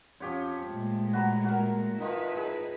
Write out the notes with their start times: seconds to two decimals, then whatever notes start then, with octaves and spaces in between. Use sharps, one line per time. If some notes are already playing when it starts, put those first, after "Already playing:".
0.20 F2 F3 C#4 G4 C#5
0.69 A#2 G#3 A3
1.13 F#4 B4 A#5
1.44 F#4 A#4
2.00 D#3 F3 D#4 E4 B4 C#6
2.37 G#4